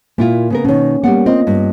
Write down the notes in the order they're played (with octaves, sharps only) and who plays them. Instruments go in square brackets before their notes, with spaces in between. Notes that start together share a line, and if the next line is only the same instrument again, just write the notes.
[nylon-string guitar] A#2 E4 F4 [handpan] A#3
[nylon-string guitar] C#3 B3 A#4
[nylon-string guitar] B2 D#3 [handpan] C#4 C#5
[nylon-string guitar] G3 D5 F#5 [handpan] A#3 B3
[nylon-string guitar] C4 [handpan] F4 D#5
[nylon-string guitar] G2